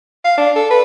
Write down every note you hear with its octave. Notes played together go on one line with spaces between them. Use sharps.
F5
D4
A4
B4